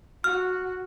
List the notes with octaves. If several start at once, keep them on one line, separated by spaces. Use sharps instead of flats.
F#4 F6